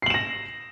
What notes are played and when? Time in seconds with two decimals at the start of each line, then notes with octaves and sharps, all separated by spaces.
0.02 C7
0.06 F#7
0.10 E7
0.14 A#6